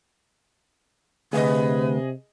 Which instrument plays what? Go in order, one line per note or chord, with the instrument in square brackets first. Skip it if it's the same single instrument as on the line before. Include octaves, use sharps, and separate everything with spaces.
[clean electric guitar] D2 [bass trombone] C3 [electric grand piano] G#4 D#5 [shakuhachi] B4